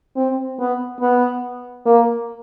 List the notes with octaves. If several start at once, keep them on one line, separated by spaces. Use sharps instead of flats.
C4
B3
B3
A#3